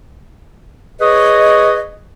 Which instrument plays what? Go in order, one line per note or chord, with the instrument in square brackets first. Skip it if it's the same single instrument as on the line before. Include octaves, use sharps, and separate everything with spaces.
[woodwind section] G#4 B4 C#5 D#5